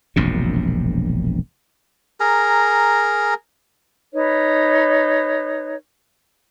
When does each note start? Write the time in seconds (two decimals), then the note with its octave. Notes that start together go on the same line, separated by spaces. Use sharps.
0.16 E1 A#1 F#2 C3
2.20 G#4 A#4 A#5
4.13 D#4 B4 C#5